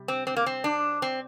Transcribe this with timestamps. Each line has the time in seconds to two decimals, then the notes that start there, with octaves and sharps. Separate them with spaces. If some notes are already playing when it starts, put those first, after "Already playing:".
Already playing: C3 G3
0.08 C4
0.27 C4
0.37 A#3
0.46 C4
0.64 D4
1.02 C4